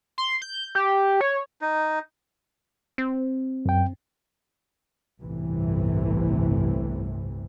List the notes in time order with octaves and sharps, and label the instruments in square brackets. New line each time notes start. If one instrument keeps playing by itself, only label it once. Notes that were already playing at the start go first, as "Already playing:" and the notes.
[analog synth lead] C6
G6
G4
C#5
[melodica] D#4
[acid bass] C4
[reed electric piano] F#2 G5
[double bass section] G1 C2 A2 C3 E3